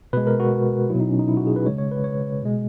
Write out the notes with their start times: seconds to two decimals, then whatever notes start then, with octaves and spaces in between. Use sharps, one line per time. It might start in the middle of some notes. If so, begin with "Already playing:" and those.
0.13 B2 G#3 B4
0.27 A#4
0.40 F#4
0.90 F#3 E4
0.95 B2
1.00 D#4
1.09 C#4
1.19 D#4
1.28 E4
1.37 F#4
1.47 G#4
1.56 B4
1.66 C#3 G#3 C#5
1.78 C#5
1.91 B4
2.04 C#5
2.43 B2 G#3